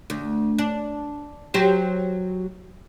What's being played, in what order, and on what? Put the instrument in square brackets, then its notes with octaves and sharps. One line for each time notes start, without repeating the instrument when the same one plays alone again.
[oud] D2
D4
F#3 G4 C5